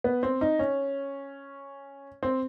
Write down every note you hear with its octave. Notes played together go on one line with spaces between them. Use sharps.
B3
C4
D#4
C#4
C4